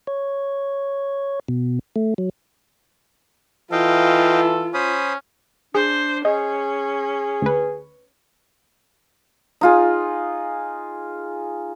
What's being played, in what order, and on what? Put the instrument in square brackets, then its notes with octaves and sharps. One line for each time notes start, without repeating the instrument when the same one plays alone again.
[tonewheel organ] C#5
B2
A3
F#3
[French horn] E3 [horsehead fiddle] F4 [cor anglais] A4 [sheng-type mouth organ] D#5 F5 G5
[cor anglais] C#4 [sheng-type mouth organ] C5 B5 D#6
[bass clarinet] D4 [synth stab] G#4 [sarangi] C5
[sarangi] C#4 [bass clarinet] G#4 [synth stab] D#5
[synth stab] D2 B4
[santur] D#4 F4 G#4